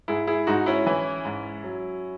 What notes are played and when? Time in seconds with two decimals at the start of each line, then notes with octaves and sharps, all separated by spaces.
0.08 G#2 E4 G#4
0.27 E4 G#4
0.47 G#2 D#4 F#4
0.66 C#4 E4
0.87 E3
1.25 G#2
1.64 F#3